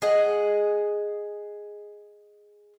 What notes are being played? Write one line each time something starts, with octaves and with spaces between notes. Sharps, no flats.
G#4 D#5 F#5